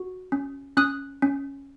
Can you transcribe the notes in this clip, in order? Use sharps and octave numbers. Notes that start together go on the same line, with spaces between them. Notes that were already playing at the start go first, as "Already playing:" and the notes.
Already playing: F#4
C#4
C#4 D#6 F#6
C#4